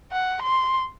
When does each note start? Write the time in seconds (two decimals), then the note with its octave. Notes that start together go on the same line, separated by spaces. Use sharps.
0.12 F#5
0.43 C6